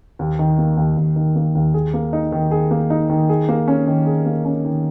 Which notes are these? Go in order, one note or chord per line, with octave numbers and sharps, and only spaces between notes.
D#2
D#3
A#3
D#2
D#2
D#3
A#3
D#2
G#4
A#3
D#4
D#3
G#4
A#3
D#4
D#3
G#4
A#3
C#4
D#3
G#4
A#3
C#4
D#3